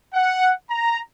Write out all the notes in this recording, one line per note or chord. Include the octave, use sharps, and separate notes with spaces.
F#5
A#5